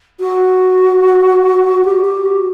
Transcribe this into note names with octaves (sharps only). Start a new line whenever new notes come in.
F#4
G4
G4
F#4